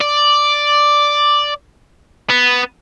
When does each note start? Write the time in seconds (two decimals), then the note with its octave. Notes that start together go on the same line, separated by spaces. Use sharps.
0.01 D5
2.30 B3